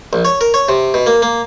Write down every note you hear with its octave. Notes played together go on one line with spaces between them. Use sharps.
A#1
C#5
A#4
C#5
C3
B2
A#3
A#3